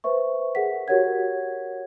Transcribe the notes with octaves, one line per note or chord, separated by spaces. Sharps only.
B4 C5 E5 C#6
G#4 A#4 F#5 B6
F#4 G4 A#4 C#5 F#5 G#6